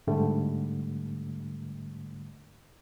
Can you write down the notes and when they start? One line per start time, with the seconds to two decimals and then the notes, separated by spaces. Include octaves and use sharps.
0.07 G#2 D3 G3 A3